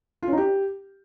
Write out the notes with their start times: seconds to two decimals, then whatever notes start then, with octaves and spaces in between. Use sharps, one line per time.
0.23 F4
0.28 C#4
0.33 D#4
0.38 G4